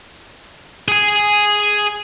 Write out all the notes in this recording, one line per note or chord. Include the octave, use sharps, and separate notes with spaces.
G#4 G#5